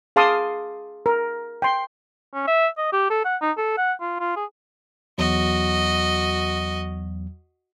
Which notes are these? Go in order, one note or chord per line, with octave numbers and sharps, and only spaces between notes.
G#4 F5 A5 C6 D6 D#6
A#4
G5 C6
C#4
E5
D#5
G4
A4
F#5
D#4
A4
F#5
F4
F4
G#4
E2 F#3 F#4 D#5